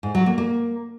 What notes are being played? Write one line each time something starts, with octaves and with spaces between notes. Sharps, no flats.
G#2
F#3
A#3
A#3